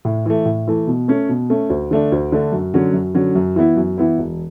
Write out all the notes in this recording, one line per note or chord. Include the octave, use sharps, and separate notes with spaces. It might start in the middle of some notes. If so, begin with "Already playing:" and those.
A2
E3 A3
A2
E3 A3
B2
A3 C#4
B2
A3 C#4
D2
D3 A3 D4
D2
D3 A3 D4
F#2
D3 F#3 C#4
F#2
D3 F#3 C#4
F#2
E3 B3 E4
F#2
E3 B3 E4
E1